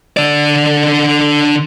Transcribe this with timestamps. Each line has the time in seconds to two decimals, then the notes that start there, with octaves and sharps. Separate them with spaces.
0.17 D3 D5